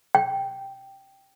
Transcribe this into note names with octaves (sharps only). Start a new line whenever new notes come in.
G5